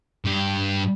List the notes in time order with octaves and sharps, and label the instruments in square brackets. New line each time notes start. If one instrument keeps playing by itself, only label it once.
[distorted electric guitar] G2 G4